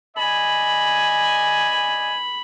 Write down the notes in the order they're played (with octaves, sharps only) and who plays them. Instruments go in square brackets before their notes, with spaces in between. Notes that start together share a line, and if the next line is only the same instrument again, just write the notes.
[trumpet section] D5 D#5 G#5 [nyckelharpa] B5